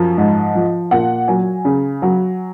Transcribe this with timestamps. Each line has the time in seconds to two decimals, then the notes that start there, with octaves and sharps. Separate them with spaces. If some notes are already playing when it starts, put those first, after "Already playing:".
Already playing: F#2 F3
0.18 G#2
0.55 F3
0.91 A#2 F#5
1.28 F#3 G#5
1.65 C#3
2.02 F#3